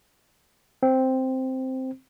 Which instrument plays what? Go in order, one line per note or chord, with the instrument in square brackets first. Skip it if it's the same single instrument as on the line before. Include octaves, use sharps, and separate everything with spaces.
[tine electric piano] C4